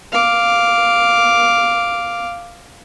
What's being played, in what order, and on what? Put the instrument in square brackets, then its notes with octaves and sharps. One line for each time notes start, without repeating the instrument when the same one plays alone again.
[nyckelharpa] F5 D6